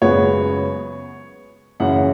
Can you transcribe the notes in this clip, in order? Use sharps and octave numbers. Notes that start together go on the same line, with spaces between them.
F#2 C#3 G#3 B3 C#5
F#2 C#3 E3 F#5